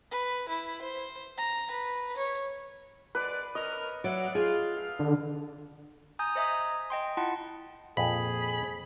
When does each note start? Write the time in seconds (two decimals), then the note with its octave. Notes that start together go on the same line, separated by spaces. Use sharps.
0.11 B4
0.48 E4
0.82 C5
1.37 A#5
1.71 B4
2.17 C#5
3.15 G#3 B4 D5
3.55 C#4 A#4 D#5
4.04 F#3 D5 E5 F#5
4.35 F4 G#4
4.76 A3 F5
4.99 D3
6.19 G#5 A#5 D#6 G6
6.35 C5 D#5 E5 G#5 A#5 D#6
6.90 D#5 G5 C6
7.17 E4 F4 F#5 A5 C6
7.97 F2 A#2 G#4 G#5 B5